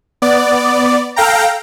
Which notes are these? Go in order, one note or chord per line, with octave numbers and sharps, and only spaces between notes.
B3 D5
A4 F5 G5 A#5